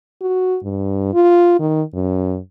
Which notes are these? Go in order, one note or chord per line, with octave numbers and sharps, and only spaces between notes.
F#4
G2
F4
D#3
F#2